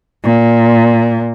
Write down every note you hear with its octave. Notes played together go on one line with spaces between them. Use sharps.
A#2